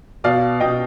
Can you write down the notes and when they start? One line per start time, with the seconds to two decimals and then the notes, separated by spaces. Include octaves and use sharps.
0.24 B2 D5 F5
0.60 B2 D#5 G5